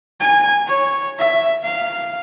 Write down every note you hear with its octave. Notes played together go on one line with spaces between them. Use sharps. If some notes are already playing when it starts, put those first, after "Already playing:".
G#5
C#5
E5
F5